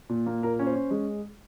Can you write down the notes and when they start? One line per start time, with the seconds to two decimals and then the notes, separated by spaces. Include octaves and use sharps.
0.09 A#2
0.26 A#3
0.43 A#2 A#4
0.59 C#4
0.66 C5
0.75 C#4
0.91 G#3